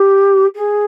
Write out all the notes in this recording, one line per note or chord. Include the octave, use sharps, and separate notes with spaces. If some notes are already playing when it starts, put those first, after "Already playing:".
Already playing: G4
G#4